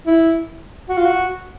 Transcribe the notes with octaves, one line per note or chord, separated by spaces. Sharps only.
E4
F#4
F4
F#4